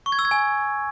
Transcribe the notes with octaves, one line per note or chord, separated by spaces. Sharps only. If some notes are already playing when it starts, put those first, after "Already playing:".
C#6
G#6
E6
G#6
G#5